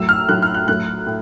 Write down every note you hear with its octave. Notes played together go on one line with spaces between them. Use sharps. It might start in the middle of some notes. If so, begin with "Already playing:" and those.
Already playing: A2 F#3 A3 E6
F6
A2 F#3 A3 F#6
F6
F#6
A2 F#3 A3 F#6
A2